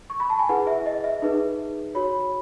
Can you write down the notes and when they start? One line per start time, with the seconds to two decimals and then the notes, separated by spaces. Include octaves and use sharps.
0.10 C#6
0.20 B5
0.30 A5
0.39 G#5
0.49 E4 G#4 B4 F#5
0.67 E5
0.86 D#5
1.04 E5
1.22 D#4 G#4 B4 E5
1.95 F#4 C#5 B5